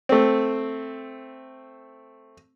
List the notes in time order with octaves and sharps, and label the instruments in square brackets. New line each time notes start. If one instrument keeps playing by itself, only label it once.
[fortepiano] A3 C4